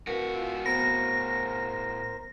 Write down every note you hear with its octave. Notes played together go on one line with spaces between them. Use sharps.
A2 F#4 A#4 B4
F4 E6
B3 A#4 C5 A#6